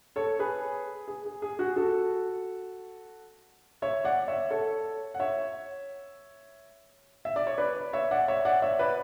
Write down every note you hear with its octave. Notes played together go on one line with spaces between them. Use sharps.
A4 C#5
G#4 B4
G#4
G#4
G#4
F#4
F#4 A4
C#5 E5
D5 F#5
C#5 E5
A4 C#5
F#5
C#5 E5
E5
D5
C#5
B4 D5
C#5 E5
D5 F#5
C#5 E5
D5 F#5
C#5 E5
B4 D5